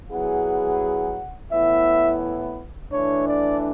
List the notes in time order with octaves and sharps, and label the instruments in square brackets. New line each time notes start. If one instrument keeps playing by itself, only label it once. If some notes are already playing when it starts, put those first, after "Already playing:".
[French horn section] F#3 B3 E4 G#4 [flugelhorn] F#5
[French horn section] A2 E3 B3 E4 [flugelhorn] E5
[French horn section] E3 A3 D4 [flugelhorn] C#5
[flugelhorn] D5